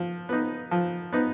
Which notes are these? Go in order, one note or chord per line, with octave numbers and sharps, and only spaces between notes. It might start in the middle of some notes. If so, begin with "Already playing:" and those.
Already playing: F3
B3 D#4
F3
B3 D#4